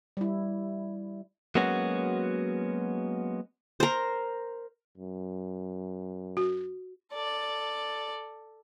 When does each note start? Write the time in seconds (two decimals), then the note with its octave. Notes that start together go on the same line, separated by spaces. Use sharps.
0.17 G3 E4
1.55 F#3 G#3 A#3 B3 C#4 F#4
3.80 A#4 C5
4.97 F#2
6.37 F#4
7.14 A4 D5